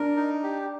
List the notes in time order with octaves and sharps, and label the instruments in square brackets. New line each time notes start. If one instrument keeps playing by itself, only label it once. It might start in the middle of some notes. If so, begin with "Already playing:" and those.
Already playing: [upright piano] D4 [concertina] A#4
[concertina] D#4
G4